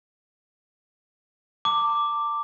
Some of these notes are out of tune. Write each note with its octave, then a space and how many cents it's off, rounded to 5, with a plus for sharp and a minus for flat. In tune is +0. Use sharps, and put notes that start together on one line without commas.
A5 +45 D6 +0